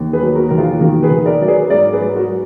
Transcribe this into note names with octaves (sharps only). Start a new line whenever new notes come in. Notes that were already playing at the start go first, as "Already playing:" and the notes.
Already playing: D#2
G#4 B4
F#3
F#4 A#4
D#2 A#4
F4 G#4
D#3 F#4 A#4
G#4 B4
D#3
A#4 D5
F#3 D5
G#4 B4
G#2 A#4 D5
G#4 B4
F#3
F#4 A#4